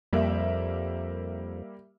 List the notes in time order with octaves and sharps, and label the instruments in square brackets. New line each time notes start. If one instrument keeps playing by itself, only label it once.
[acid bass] F2 [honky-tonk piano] G3 A#3 E5